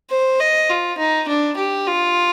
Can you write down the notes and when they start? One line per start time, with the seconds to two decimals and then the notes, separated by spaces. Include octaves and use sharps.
0.10 C5
0.40 D#5
0.70 F4
0.98 D#4
1.28 D4
1.57 G4
1.87 F4